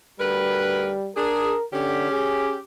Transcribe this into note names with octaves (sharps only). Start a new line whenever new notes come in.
D2 G3 A#4 B4
D4 G#4 A#4
D3 C#4 G4
G#4